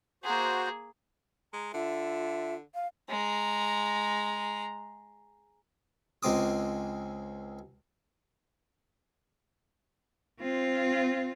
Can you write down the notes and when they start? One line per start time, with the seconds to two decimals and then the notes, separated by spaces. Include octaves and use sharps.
0.24 A#3 F#4 G#4 C5
1.53 G#3 A#5
1.74 D3 F4 E5
2.75 F5
3.09 G#3 A#5
6.23 C#2 G#3 C4 D6 D#6
10.40 C4 F4